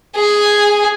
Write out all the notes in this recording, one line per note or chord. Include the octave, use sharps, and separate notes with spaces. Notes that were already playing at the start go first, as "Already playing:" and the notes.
G#4 G#5